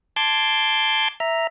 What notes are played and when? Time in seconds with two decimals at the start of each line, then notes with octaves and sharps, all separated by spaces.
0.16 A5 C6 D6 G6 G#6
1.20 E5 A#5